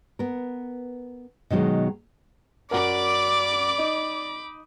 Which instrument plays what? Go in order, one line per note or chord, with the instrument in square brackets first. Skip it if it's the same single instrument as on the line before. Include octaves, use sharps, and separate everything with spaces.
[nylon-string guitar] B3 A#4
B2 D#3 F#3 G#3
[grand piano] F#2 F#4 A#4 [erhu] D5 [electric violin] B5 D6
[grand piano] D#4 D#5